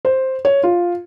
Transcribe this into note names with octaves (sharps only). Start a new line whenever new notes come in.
C5
C#5
F4